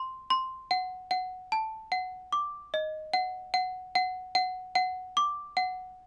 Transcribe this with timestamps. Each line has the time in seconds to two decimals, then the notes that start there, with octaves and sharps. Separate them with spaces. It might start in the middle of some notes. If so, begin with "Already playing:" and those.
Already playing: C6
0.30 C6
0.71 F#5
1.11 F#5
1.52 A5
1.92 F#5
2.32 D6
2.74 D#5
3.13 F#5
3.54 F#5
3.95 F#5
4.35 F#5
4.75 F#5
5.17 D6
5.57 F#5